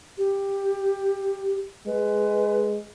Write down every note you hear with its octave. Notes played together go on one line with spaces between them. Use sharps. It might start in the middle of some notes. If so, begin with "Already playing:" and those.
G4
G#3 B4